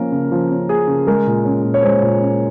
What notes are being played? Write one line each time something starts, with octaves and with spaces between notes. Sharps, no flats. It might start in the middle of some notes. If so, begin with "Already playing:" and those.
Already playing: F3 A#3 C#4 A#4
C#3
F3
C#4
A#3 G#4
C#3
G#3 A#4
A#2
C#4
A#2
C#5
G#3 C5
A#2
C#4